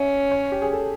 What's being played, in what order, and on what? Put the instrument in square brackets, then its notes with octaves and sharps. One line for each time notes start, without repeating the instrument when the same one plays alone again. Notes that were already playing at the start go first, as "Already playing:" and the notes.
Already playing: [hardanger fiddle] C#4 [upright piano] E5
[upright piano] C#5
G4
G#4
A4